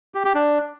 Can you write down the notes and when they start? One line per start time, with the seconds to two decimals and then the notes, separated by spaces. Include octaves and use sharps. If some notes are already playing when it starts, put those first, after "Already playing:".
0.15 G4
0.25 G4
0.35 D4